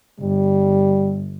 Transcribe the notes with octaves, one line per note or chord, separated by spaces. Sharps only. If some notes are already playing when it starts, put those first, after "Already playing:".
G1 G3